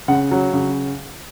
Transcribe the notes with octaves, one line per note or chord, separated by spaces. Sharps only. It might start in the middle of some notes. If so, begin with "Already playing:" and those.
C#3 F#5
F#3
C#3